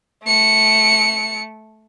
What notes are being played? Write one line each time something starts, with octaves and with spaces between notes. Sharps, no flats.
A3 C#7